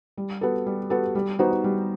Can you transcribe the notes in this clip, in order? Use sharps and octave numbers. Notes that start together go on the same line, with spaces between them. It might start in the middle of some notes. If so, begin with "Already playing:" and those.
G3
B3 F#4 A4
G3
B3 F#4 A4
G3
B3 D#4 F#4 C5
G3